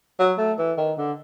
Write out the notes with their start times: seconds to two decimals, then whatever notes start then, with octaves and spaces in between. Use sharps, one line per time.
0.19 F#3
0.38 A3
0.58 E3
0.78 D#3
0.98 D3